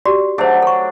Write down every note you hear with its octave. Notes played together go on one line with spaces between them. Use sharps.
F#4 G4 D5
F#3 A3 D4 G#4 C5
A4 C#6